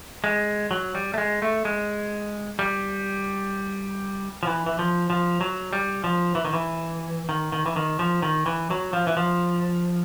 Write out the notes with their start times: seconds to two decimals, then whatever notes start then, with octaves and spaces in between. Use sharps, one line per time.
0.24 G#3
0.71 F#3
0.95 G3
1.14 A3
1.18 G#3
1.42 A3
1.65 G#3
2.59 G3
4.43 F3
4.47 E3
4.66 E3
4.79 F3
5.10 F3
5.41 F#3
5.73 G3
6.04 F3
6.35 E3
6.45 D#3
6.53 E3
7.29 D#3
7.52 D#3
7.66 E3
7.76 D#3
7.99 F3
8.22 D#3
8.46 E3
8.71 F#3
8.93 F3
9.07 E3
9.17 F3